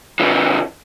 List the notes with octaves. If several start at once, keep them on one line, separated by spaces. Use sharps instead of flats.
C#3 E3